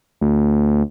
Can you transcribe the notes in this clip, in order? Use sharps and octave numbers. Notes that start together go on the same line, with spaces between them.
D2